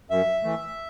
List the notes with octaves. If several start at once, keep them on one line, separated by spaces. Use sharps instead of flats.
F#2 E5
E3 A3